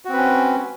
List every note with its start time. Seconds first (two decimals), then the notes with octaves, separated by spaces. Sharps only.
0.05 F#4
0.09 C4
0.13 B4
0.17 C#4